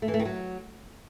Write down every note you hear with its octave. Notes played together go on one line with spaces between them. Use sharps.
A3
E3
A3
D#3
F#3